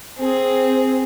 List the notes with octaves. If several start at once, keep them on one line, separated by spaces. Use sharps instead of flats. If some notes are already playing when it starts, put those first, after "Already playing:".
C4 G#4